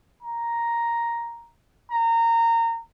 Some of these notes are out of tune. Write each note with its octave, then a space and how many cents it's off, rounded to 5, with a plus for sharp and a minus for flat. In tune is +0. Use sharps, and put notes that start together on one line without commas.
A#5 +5
A#5 -20